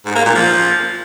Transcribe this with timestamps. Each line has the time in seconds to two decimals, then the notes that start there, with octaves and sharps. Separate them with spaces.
0.06 G#2
0.15 A#3
0.25 A#2
0.35 F3